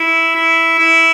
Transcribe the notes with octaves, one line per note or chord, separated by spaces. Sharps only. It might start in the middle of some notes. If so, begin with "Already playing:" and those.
Already playing: E4
E4
E4